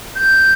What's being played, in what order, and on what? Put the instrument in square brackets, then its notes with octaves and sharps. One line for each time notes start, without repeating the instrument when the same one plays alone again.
[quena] G6